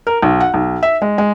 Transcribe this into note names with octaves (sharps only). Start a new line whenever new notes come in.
A#4
B1
F#5
B1
E5
G#3
G#3